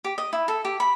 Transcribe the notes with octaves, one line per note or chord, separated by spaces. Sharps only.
G4
D#5
E4
A4
G4
B5